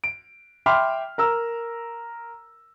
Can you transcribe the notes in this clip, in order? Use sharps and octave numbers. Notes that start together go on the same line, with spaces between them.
D7
E5 G5 B5 C6 D6 F6
A#4 A#5 E6